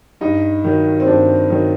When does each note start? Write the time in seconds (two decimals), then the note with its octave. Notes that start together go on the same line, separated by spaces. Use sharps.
0.21 G2 D#4
0.64 D#3 F#3
1.00 C4
1.07 G2 D4
1.50 D#3 F#3